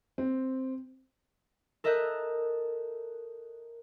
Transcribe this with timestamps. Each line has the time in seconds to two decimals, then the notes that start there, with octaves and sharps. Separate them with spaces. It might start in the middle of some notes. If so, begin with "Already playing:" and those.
0.18 C4
1.84 A4 A#4 D#5 E5 F#6 G6